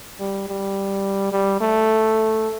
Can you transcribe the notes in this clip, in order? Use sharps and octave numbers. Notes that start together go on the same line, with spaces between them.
G3
G3
G3
A3